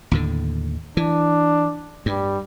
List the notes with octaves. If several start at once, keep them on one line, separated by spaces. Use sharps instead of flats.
D#2 A2 D3
E3 D4
G2 G3